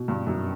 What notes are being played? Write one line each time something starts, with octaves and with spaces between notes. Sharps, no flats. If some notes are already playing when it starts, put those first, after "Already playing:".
Already playing: B2
G2
F#2